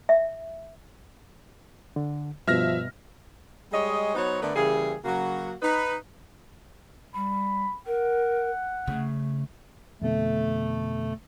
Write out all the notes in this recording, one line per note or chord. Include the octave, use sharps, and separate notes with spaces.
E5
D3
G2 B2 F3 E5 F6 A#6
G3 G#3 G#4 C#5 D#5
F#3 B3 D#4 F#4 C5 C#5
D3 A3 B3 A#4 B4 D5
C#3 E3 G3 A#3 G#4
C#3 F#3 A#3 F#4
D#4 B4
G3 B5
A#4 F#5
C#3 A3
F2 B2 D3 A3